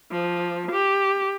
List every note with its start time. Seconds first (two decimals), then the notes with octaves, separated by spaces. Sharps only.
0.11 F3
0.71 G4